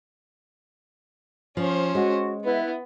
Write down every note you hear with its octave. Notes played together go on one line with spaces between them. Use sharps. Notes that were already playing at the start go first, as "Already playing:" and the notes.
F3 C#4 C5
G#3 F#4
B3 E4 B4